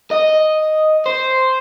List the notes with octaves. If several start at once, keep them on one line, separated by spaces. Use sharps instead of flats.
D#5
C5